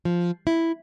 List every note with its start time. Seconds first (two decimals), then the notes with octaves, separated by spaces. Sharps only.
0.05 F3
0.47 E4